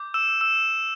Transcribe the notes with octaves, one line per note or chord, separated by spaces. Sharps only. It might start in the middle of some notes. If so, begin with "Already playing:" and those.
Already playing: D6 G6
E6 E7
E6 E7